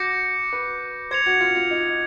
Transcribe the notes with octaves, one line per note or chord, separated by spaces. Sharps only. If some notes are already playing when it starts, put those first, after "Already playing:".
Already playing: F#4 D6 G6 A#6 C#7
B4
C5 G#6 C#7 F7
F#4
F4
F4
D#4